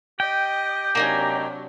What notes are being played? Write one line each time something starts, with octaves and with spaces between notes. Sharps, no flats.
G4 D#5 G5
C3 F#3 A#3 D4 D#4 G#5